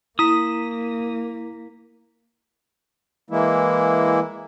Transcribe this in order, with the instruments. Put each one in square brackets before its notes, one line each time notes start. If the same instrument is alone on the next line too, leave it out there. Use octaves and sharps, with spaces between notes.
[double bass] A#3 [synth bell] E4 A#5 B6 [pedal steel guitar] D#6
[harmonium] E3 G#3 A#3 E4